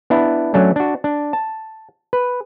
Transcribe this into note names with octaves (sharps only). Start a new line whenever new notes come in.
B3 D4 E4
F#3 A3 C#4 D4
D4 F#4
D4
A5
B4